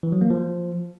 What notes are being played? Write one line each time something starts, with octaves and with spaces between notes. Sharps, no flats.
E3
F#3
A#3
F3